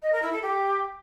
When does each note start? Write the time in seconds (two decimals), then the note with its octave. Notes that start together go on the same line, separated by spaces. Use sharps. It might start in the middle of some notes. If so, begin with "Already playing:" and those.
0.02 D#5
0.12 A#4
0.22 E4
0.32 A4
0.42 G4